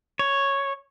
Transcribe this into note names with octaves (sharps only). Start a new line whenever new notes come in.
C#5